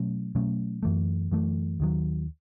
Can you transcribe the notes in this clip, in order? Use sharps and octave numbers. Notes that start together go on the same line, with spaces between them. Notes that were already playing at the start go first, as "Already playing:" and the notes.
Already playing: B2 F#3 A3 C#4
B2 F#3 A3 C#4
F#2 E3 A3
F#2 E3 A3
D#2 D#3 F#3